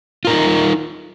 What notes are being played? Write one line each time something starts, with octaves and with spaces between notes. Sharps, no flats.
D#4 F4 A#4